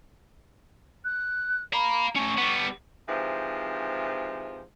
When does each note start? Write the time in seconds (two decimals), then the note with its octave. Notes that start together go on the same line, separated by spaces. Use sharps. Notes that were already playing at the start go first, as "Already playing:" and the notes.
1.05 F#6
1.73 F5 A#5 B5
2.16 A3 C#4 C#6
2.38 G3 B3
3.07 G#2 C3 E3 F3